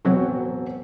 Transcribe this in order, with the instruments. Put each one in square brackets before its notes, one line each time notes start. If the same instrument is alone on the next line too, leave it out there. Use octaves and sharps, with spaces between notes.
[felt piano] E1 C4 F#4 [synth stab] A2 F#3